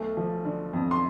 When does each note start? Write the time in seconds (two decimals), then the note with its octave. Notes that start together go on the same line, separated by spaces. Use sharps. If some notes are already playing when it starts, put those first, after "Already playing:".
Already playing: B1 A3
0.17 F3
0.45 D3
0.73 F2
0.91 C6